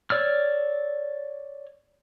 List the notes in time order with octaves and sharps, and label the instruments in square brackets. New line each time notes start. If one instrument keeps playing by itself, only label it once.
[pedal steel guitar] C#5 D5 E6 F6